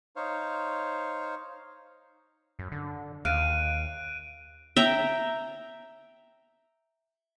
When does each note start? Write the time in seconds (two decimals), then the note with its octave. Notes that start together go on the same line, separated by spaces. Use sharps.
0.16 D#4 C5 C#5 F5
2.59 F#2
2.72 D3
3.25 D#2 F5 F#6 D7 D#7
4.76 E5 G5 A#5